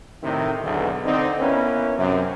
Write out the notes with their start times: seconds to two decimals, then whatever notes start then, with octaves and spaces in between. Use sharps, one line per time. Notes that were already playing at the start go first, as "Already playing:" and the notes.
0.23 A2 C3 D#3 A3 D#4 E4
0.63 B1 E2 D3
1.05 D3 C4 D#4
1.39 A#3 B3 C#4 E4 B4
1.97 F#2 C3